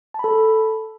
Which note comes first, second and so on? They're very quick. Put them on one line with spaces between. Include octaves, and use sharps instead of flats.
A5 B5 A4